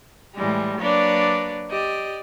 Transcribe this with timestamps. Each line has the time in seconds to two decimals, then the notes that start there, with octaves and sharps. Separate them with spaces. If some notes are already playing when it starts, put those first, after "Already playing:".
0.35 A2 E3 G3 G#3
0.79 F#3 A#3 D4 B4 C#5 D5
1.69 G4 D5 D#5